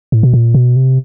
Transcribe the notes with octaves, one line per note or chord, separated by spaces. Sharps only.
A2
B2
A#2
B2
C3